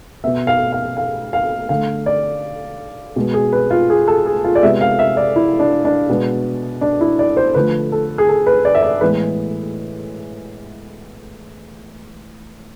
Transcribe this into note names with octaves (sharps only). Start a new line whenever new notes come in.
B2 B3 E5
F5
F5
F5
F5
D3 A3 F5
D5
B2 G#3 B3
G#4
B4
F4
G#4
A4
G#4
F4
D5
C3 G#3 B3 E5
F5
E5
D5
E4
D4
D4
B2 G#3 B3
D4
E4
D5
C5
D3 F3 A3 B4
A4
G#4
A4
B4
D5
E5
D5
A2 E3 G#3 B3 B4